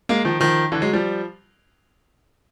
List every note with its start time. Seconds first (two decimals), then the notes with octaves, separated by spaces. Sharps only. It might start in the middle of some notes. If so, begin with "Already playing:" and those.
0.09 G#3 A#3
0.25 D#3 F3
0.40 D#3 F3
0.72 D3 E3
0.82 F#3 G#3
0.93 F3 G3